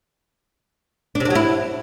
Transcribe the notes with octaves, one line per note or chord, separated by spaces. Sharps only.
D4
C3
D4
F#3
E4